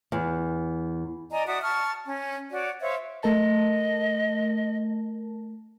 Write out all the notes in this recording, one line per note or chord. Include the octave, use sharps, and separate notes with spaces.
E2
D5 D#5 G#5 A#5
F#4 D5 E5 D#6
A5 C#6 F6
C#4
F#4 C#5 D5
C5 C#5 E5 F5
A3 A#4 D#5 A5